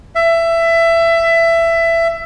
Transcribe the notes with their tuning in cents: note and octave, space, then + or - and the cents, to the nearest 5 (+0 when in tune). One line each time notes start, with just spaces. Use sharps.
E5 +20